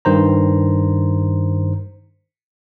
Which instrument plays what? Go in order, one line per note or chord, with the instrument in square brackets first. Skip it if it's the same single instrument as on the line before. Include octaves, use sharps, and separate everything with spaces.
[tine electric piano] G2 D#3 C5 A#5